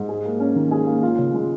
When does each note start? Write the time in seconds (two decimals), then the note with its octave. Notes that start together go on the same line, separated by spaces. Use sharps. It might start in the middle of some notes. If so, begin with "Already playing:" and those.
Already playing: G#2
0.09 G#4
0.25 A#3
0.40 C#4
0.56 D#3
0.71 G#4
0.87 A#3
1.03 F4
1.19 C#3
1.34 G#3